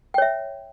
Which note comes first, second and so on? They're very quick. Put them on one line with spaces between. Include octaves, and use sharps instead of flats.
G5 C#5 E5